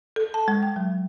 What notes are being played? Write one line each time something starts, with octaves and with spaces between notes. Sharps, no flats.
A4
A5
G#3
G5
F#3